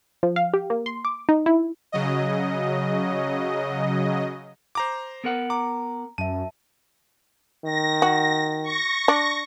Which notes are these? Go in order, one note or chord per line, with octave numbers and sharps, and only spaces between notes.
F3
F5
G4
A#3
C6
D6
D#4
E4
C#3 F#3 D#5
C5 A#5 D6
B3 A#4 F#5
A#5 D6
F#2 E5 A5 D#7
D#3 A#6
F#4
C#6 A#6
D4